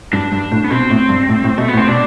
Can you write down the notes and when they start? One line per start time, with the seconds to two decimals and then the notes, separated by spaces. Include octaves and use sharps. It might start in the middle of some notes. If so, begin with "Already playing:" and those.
0.13 G2 D4
0.32 G2
0.52 A2
0.64 B3
0.70 B2 C4
0.91 A2
1.09 G2
1.29 A2
1.44 A2
1.58 B2 A3
1.68 B3
1.73 A2
1.77 C4
1.88 B2 D4